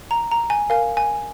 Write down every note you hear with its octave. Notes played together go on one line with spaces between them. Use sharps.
A#5
A#5
G#5
A#4 F5 G#5
G#5